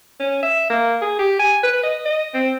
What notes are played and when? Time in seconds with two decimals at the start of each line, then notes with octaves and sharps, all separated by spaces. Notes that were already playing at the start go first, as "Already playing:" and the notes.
0.20 C#4
0.43 E5
0.70 A#3
1.02 G#4
1.19 G4
1.39 G#5
1.63 B4
1.83 D#5
2.05 D#5
2.34 C4